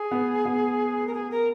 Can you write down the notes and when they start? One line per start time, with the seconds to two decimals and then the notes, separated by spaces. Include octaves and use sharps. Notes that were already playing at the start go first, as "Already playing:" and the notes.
Already playing: G#4
0.11 B3
0.45 B3
1.07 A#4
1.13 G#4
1.30 A#4